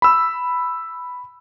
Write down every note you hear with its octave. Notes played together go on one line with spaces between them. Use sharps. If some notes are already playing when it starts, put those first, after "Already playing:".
B5 E6